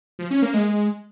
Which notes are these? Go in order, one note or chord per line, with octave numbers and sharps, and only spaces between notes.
F3
C#4
A#3
G#3